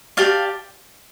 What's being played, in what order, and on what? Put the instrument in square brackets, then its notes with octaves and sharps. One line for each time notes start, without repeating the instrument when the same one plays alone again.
[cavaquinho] G4 D5 F5 A5